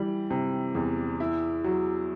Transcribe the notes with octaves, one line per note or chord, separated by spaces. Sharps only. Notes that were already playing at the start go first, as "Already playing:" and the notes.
Already playing: E3 G3
C3
E2
E4
F#3